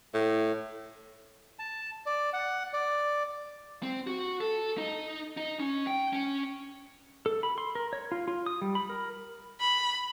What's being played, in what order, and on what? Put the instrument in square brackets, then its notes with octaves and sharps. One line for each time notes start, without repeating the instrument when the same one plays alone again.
[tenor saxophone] A2
[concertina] A5
D5
F#5
D5
[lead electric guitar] C4
F#4
A4
D#4
D#4
C#4
G5
C#4
[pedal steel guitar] A4
B5
C6
A#4
C#5
F4
F4
D#6
G3
B5
A#4
[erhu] B5